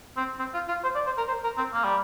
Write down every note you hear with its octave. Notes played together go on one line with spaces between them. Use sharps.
C4
C4
F4
F4
C5
D5
C5
A#4
C5
A#4
C4
A#3
G3